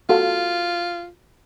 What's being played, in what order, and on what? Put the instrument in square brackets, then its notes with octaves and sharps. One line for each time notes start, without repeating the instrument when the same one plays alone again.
[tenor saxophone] F4 [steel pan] F#4 A4 F5